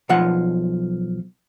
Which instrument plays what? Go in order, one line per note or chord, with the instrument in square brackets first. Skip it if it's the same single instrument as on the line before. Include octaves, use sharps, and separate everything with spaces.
[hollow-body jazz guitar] B1 F3 F#5